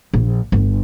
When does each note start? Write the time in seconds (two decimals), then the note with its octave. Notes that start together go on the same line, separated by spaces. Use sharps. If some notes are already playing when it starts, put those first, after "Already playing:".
0.14 A#1
0.52 G1